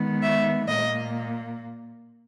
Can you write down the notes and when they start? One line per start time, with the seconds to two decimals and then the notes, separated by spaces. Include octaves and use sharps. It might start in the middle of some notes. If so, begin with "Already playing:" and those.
Already playing: D#3 G#3 B3
0.22 E5
0.68 A#2 A#3 D#5